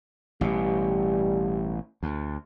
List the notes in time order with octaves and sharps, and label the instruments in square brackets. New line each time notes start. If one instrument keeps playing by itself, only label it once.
[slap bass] A1 B2 [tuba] G3
[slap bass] D2